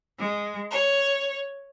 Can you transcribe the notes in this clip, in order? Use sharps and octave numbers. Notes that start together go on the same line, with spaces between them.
G#3
C#5